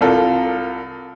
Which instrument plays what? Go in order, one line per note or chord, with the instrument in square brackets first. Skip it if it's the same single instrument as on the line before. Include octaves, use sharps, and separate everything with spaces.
[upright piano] C2 F4 A4 A#4